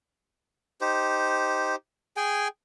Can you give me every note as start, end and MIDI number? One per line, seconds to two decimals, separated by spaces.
0.81 1.76 63
0.81 1.76 67
0.81 1.76 72
2.17 2.48 68
2.17 2.48 79
2.17 2.48 80